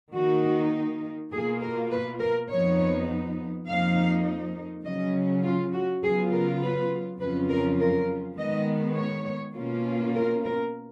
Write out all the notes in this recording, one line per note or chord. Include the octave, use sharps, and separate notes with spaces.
D#3 A#3 D#4 F#4
B2 A#3 F4 G#4
A#4
B4
A#4
F2 F3 B3 D#4 C#5
F2 F3 A#3 D#4 F5
C#3 F#3 C#4 D#5
F4
F#4
C#3 F#3 B3 F4 G#4
A#4
B4
F2 C#3 F#3 C#4 F4 B4
A#4
A#4
D#3 G#3 B3 D#5
C#5
B2 A#3 C#4 F4
A#4
A#4